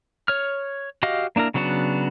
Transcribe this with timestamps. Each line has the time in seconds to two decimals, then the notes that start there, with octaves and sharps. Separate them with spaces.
0.28 C#5 F6
1.03 F#4 G4 D#5 F5
1.36 A#3 D4 E4 A#4
1.54 C#3 F#3 B3 D4 F#4